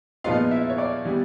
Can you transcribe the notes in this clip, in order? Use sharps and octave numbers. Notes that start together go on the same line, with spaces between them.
A#2 F3 G#3 B3 D#4 F4 F5
E4 E5
C#5
D5
E3 G3 B3